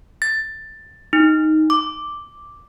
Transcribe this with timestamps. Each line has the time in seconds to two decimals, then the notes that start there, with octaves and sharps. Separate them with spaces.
0.22 A6
1.13 D#4
1.70 D6